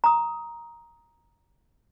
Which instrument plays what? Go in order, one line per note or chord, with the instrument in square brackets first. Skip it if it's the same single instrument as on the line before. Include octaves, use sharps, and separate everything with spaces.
[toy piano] A#5 D#6